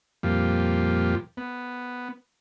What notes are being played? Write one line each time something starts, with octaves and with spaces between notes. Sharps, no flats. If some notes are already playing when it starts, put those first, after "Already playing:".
F2 A#2 F3 G3
B3